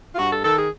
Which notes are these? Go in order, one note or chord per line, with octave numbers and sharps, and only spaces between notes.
F4
G2 F#4
A4
D#3 A4
G#4